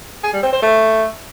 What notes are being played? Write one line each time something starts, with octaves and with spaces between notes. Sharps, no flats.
G#4
G3
C4
C5
A3